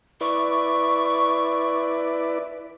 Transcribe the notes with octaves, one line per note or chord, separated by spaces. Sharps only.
E4 B4 D5 C#6